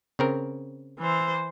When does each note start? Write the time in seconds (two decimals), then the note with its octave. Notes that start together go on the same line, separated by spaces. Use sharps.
0.19 C#3 C4 A#4
0.99 E3 C5